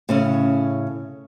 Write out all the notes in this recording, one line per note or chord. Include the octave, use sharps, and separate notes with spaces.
A2 C#3 C#4